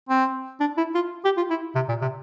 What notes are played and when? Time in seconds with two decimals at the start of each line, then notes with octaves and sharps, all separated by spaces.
0.09 C4
0.60 D4
0.77 E4
0.94 F4
1.25 G4
1.37 F4
1.50 E4
1.75 C3
1.89 A#2
2.01 C3